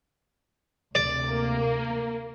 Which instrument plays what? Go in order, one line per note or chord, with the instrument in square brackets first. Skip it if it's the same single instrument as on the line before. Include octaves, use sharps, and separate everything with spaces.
[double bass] D2 C3 [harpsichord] D5
[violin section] A#3